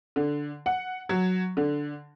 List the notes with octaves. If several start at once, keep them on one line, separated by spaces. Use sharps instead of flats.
D3
F#5
F#3
D3